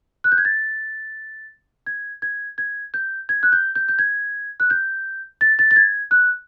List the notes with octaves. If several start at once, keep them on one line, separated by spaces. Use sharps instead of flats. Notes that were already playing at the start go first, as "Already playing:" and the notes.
F#6
G6
G#6
A6
G#6
G#6
G#6
G6
G#6
F#6
G6
G6
G6
G#6
F#6
G6
A6
A6
A6
G#6
F#6